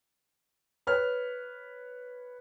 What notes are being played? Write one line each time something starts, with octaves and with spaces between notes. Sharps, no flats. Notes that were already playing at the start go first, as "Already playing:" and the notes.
B4 C#5 F6